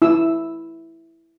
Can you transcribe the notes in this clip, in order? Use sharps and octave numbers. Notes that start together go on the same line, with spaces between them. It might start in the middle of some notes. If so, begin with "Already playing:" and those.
E4 E6